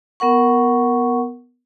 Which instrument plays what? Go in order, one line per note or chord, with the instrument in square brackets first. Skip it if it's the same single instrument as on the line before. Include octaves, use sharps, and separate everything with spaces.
[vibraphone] B3 A#4 F#5 C#6